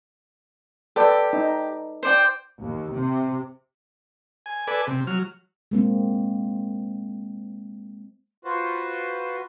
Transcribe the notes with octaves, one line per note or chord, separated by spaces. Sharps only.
G4 A4 B4 D5
D#4
C5 D5 G5
D#2
C3
G#5
A4 B4 D5 G#5
C3
F#3 F6
G#3 A#3 C4
F4 F#4 B4 C5